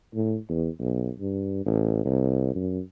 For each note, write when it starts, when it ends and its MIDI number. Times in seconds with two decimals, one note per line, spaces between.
0.15 0.37 45
0.49 0.68 40
0.79 1.10 35
1.20 1.65 43
1.66 2.00 33
2.05 2.54 36
2.55 2.80 42